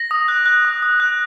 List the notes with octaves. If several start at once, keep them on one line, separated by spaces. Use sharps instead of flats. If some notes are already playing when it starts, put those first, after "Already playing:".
Already playing: A#6
D#6
F#6
F#6
D#6
D#6
F#6